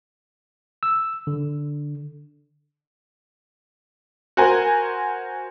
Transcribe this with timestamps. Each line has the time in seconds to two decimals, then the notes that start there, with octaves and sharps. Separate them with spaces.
0.83 E6
1.27 D3
4.37 F#4 A#4 C5 G#5